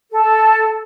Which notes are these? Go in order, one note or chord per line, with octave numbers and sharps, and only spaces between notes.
A4